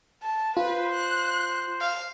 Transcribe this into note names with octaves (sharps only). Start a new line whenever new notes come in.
A5
F4 B4 C5
F#6
F5